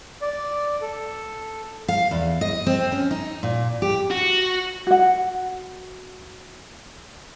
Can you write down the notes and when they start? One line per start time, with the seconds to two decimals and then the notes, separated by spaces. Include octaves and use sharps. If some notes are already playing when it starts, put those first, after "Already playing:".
0.22 D5
0.82 A4
1.88 F5
2.11 E2
2.41 D#5
2.67 C4
2.92 C#4
3.11 D#4
3.43 A#2
3.82 G4
4.10 F#4
4.87 F#4 F#5